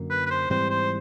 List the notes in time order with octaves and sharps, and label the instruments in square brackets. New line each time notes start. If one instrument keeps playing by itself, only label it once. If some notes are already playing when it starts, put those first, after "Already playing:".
Already playing: [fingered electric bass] F#2 D3 F#3 A#3
[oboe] B4
B4
C5
[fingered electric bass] G#2 E3 G3 C4 [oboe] C5
[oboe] C5